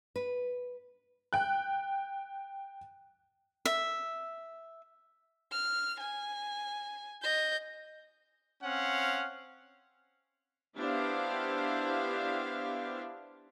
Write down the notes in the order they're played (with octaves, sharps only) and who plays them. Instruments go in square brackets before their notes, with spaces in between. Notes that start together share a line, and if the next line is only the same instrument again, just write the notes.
[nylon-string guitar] B4
[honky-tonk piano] G5 F#6
[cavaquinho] E5
[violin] F6
G#5
D#5 G6
[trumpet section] C4 C#4 F5 F#5
[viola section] B3 D4 E4 G4 C5 F5